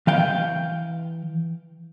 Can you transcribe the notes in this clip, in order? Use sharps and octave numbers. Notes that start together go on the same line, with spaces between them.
E3 F5 G5